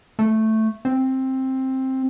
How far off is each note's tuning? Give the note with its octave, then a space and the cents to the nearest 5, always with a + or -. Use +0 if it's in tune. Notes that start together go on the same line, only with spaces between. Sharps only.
A3 +0
C4 +10